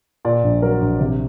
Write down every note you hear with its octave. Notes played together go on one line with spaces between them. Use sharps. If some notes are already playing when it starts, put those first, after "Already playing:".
A#2 D5
A#1
F#3 A#4
A#1
C3